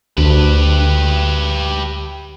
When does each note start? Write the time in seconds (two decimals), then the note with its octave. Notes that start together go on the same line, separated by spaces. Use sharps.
0.18 D2 G4 B4